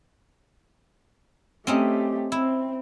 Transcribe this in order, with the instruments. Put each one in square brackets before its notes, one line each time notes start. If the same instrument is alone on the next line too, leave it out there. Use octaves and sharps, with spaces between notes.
[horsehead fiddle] A3 G4 [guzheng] C4 C#4 D#4
[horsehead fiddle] C4 [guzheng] E4